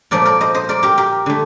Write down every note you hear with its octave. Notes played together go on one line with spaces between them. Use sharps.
A#2 F3 A3 A#4 D5
A#4 D5
C5 D#5
C5 D#5
A#4 D5
G4 A#4
G4 A#4
D3 A3